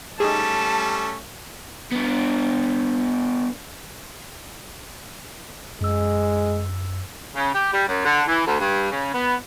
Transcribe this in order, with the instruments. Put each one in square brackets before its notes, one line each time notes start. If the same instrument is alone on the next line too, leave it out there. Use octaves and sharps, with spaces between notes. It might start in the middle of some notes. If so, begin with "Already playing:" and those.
[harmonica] G3 A3 C#4 [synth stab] D#4 G#4 [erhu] A5
[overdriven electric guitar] B3 D4
[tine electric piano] F#2 E6 [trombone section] G#3
[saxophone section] C#3
G4
G3
F#2
D3
E3
D2
G2
C#3
B3